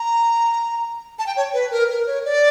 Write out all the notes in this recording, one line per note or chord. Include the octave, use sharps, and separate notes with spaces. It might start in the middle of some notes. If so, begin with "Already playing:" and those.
Already playing: A#5
A5
G5
C#5
B4
A#4
A#4
C#5
D5